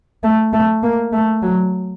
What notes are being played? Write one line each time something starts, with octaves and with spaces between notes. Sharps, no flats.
A3
A3
A#3
A3
F#3